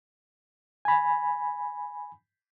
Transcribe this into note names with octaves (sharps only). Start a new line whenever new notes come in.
G#5 B5